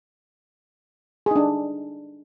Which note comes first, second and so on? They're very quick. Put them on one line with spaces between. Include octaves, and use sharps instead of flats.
G#4 D#4 D4